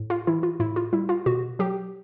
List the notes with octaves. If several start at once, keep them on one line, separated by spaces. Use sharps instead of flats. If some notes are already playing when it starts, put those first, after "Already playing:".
Already playing: A2
F4
E3 E4
F4
A2 E4
F4
G3 E4
F4
B2 F#4
F#3 G4